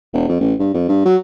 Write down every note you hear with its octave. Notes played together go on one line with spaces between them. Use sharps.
E1
F2
A1
G2
F2
G2
F#3